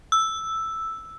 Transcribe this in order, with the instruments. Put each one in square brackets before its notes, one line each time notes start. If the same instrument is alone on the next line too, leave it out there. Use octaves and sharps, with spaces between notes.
[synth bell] E6